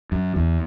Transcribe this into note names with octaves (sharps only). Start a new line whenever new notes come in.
F#2
E2